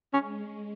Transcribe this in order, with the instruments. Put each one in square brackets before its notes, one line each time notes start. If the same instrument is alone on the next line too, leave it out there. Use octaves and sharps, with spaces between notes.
[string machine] G#3 [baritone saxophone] C#4